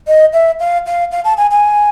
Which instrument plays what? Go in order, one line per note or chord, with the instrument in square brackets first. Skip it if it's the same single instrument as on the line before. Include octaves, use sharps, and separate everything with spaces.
[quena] D#5
E5
F5
F5
F5
A5
G#5
G#5